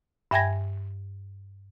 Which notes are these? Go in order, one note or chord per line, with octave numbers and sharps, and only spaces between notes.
G2 E5 G5 G#5 G#6 A#6